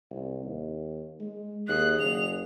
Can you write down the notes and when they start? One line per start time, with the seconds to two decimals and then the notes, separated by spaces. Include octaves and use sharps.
0.11 C2
0.45 D#2
1.20 G#3
1.68 D#2 G#4 F#6
1.99 F#1 F7